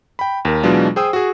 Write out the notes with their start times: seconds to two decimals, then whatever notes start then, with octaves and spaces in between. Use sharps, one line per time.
0.19 G5 B5
0.45 D#2 A#4
0.63 B2 E3 F#3 G#3 D4 F4
0.96 G#4 C5 G5 D#6 E6
1.13 F#4 G#4